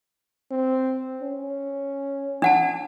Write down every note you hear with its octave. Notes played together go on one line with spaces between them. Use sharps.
C4
C#4
D4 F#5 A5